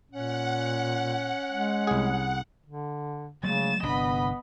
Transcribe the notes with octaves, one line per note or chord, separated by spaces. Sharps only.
A#2 C#4 F#5
G#3
C2 G#4
D3
C#3 F#3 G#3 A3 A6 E7
G1 C3 B3 D4 D#5 B5